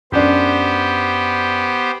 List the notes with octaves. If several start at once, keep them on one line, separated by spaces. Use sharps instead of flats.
F#2 B3 D4 G4 C5